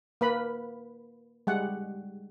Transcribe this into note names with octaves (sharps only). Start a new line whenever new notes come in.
A#3 B4 B5
G3 G#3 F#5